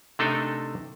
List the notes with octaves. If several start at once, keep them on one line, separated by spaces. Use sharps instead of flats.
C3 A3 D4 D#4 A4 A#4